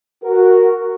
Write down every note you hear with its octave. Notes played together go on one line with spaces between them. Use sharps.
F#4 A#4